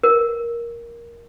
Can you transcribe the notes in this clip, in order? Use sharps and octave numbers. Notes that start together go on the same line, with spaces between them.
A#4